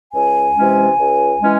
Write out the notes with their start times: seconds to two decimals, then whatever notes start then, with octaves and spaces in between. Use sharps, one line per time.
0.13 C#2 G#5
0.56 C3 E3 G#3 C#4
0.98 C#2
1.41 E3 G#3 C#4